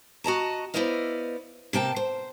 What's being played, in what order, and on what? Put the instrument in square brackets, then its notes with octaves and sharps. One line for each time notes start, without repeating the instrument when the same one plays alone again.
[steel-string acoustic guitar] F#4 D#5 A5 A#5
B3 E4 C5 D5 D#5 F5
C3 A#3 G5 A5
C5